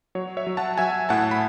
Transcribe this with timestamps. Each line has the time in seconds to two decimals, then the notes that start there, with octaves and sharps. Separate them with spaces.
0.15 F#3 C#5
0.37 C#5 E5
0.47 F#3
0.57 F#5 A5
0.78 F#3 E5 G#5
1.09 A2 F#5 A5
1.31 B5